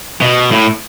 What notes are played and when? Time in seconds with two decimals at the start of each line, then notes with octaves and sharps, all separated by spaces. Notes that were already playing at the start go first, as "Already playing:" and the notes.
0.21 B2
0.52 A2